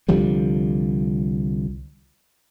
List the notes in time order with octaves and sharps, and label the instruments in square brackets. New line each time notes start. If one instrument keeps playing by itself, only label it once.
[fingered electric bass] C2 D3 F3 G3